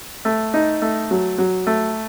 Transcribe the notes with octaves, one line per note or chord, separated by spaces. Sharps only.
A3
D#4
A3
F#3
F#3
A3